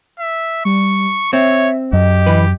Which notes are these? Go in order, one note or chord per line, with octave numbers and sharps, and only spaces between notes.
E5
G3 C#6
C4 C#5 E5
F#2 G4 D#5
E3 B4